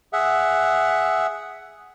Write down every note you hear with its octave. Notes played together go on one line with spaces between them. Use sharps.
G#4 E5 F#5